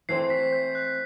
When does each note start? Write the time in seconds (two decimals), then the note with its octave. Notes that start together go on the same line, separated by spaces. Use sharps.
0.09 E3 A3 C4 C7
0.30 B6
0.53 G6
0.75 F#6